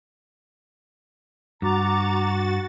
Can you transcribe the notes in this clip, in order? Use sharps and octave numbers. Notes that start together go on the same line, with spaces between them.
G2 F#4 A#5 D6 A6